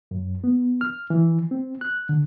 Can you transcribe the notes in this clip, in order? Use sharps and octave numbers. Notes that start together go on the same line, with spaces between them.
F#2
B3
F6
E3
C4
F#6
D3